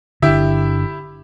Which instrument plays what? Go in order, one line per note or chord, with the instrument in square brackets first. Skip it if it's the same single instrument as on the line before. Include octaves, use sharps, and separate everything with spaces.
[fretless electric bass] G1 D3 [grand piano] E4 G4 E5